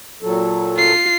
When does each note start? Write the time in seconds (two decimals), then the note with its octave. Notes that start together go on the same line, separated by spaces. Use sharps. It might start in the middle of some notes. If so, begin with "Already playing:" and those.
0.22 A#2 F#3 A4
0.76 F4 C7